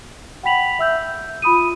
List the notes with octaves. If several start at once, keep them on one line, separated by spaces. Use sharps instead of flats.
F#5 G5 B5 B6 F7 F#7
E5 E6 G6
F4 B5 D#6 D#7